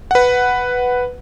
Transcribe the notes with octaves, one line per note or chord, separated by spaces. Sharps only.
B4 F#5